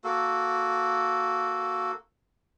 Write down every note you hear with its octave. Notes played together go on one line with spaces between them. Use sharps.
A#3 F#4 A4